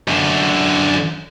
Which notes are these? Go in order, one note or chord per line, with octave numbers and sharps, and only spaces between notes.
F#2 D3